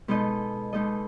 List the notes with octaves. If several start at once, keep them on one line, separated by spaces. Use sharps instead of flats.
B2 G#3 D#4 A4 D#5
B2 G#3 D#4 A4 D#5